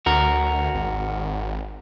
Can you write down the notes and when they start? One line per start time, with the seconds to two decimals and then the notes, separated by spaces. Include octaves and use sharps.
0.06 D2 F#4 A#4
0.74 G#1